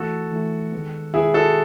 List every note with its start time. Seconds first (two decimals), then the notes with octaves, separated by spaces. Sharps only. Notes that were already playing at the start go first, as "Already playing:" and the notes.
Already playing: E3 A3 E4 F#4 A4
0.32 E3 A3 E4
0.72 D#3 G#3 B3
1.14 D#3 G#3 B3 E4 G#4
1.34 F#4 A4